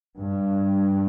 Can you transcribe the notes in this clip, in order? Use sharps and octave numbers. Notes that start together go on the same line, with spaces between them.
G2